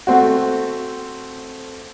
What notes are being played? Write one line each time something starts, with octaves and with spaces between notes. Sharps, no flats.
A3 C4 F#4